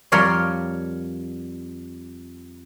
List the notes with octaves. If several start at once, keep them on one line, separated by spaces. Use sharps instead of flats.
F2 G3 A#4 C#5 D5 C6